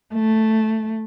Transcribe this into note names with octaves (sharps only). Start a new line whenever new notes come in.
A3